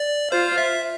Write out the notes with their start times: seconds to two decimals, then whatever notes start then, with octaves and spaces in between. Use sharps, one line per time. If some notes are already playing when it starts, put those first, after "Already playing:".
Already playing: D5
0.32 F4 C5
0.58 E5